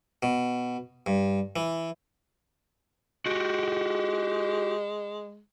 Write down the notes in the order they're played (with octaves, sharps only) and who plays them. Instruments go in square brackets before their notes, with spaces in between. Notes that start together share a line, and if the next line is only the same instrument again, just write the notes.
[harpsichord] B2
G2
E3
[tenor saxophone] G#3 [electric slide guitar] F#4 G4